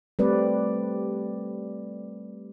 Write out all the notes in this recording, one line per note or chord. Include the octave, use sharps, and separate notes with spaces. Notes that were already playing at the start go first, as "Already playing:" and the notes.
G3 A3 C4 B4 D5